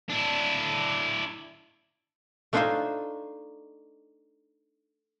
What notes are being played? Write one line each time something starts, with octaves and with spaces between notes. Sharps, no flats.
D4 E4
A3 D4 D#4 F4 C5 G#5